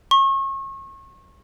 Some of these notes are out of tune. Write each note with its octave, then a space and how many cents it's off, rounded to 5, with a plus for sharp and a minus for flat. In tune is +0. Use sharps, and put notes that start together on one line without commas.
C#6 -35